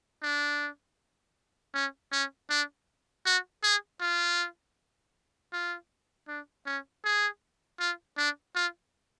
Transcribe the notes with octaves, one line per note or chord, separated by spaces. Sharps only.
D4
C#4
C#4
D4
F#4
G#4
F4
F4
D4
C#4
G#4
F4
D4
F4